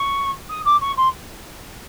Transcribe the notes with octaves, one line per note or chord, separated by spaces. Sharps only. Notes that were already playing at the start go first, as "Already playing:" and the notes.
Already playing: C#6
D#6
D6
C#6
C6